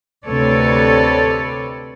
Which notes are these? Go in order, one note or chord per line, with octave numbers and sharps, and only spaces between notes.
D2 C3 A4 B4 C#5 D5